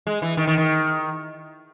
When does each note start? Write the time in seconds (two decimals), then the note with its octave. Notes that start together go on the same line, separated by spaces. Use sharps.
0.07 G#3
0.22 E3
0.37 D#3
0.47 D#3
0.58 D#3